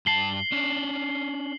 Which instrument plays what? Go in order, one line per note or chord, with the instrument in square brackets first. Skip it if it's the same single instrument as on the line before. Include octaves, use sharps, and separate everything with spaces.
[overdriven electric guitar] G2 A5 [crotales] C7 F#7 G7
[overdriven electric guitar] C#4 D4